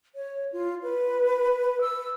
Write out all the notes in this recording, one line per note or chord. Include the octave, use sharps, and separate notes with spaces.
C#5
F4
B4
E6